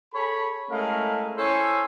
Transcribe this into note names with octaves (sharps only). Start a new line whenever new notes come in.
G#4 A4 C#5 B5
G#3 A3 C#4 E4 A#4 F5
C#4 E4 A4 C5 C#5